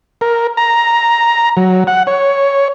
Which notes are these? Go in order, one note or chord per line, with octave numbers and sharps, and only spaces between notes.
A#4
A#5
F#3
F#5
C#5